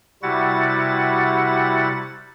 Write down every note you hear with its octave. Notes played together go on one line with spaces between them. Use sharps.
C3 G3 E4 F#4 F#5 A6